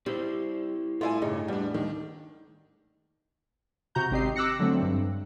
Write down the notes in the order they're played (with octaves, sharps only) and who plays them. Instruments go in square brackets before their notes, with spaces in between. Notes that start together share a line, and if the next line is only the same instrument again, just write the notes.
[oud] G3 [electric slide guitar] C4 E4 C5
[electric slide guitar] A2 [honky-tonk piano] A3 E4 G#5 [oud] F4
[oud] G2 C#3 [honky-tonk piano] D#4
[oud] E2 [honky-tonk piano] G3 D4
[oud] D#2 [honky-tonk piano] D#3
[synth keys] C3 F#4 A#5 G6
G#1 C4 G4 D#5 C7
D6 E6 F#6 A#6 C#7
D3 F#3 A3 C4
G2